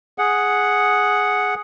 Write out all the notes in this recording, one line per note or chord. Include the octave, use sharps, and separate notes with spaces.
G#4 F#5